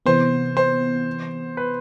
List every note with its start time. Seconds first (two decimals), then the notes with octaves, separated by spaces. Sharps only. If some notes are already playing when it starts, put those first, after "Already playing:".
0.06 C3 E3 B3 C5
0.57 C5
1.57 B4